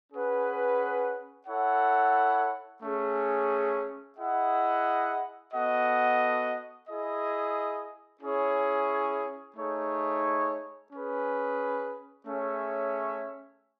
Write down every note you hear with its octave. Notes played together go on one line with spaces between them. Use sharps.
C#4 G#4 B4 F#5
E4 A4 C#5 F#5
A3 C#4 G#4
E4 G#4 D#5 F#5
B3 F#4 A4 D#5 F#5
E4 G#4 D#5
C#4 E4 G#4 C#5
A3 D#4 G#4 C#5
C#4 G#4 B4
A3 C#4 G#4 C#5 E5